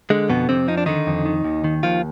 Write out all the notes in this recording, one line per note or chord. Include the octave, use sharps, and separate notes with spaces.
D3 G#3
F2 B2 B3
F2 C3 C4
F3 D#4
D4
D3 D#3 D#4
F2
D#3
D#2
D#3
D#2 F3 F4